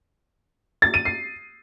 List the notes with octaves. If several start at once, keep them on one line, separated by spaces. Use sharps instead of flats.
A6
D#7
C7